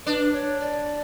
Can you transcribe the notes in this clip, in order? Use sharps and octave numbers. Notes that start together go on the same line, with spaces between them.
D4 B4
C#5
D5